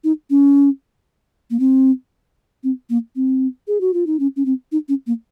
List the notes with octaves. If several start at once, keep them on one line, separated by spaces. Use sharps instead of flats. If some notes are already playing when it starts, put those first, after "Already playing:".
D#4
C#4
A#3
C4
C4
A#3
C4
G#4
F#4
F4
D#4
C#4
C#4
C4
D#4
C#4
A#3